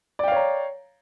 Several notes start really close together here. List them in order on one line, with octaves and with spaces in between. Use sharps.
D5 G5 F5 C#5 A#5